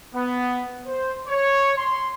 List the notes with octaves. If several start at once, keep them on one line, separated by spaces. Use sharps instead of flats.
B3
C5
C#5
C6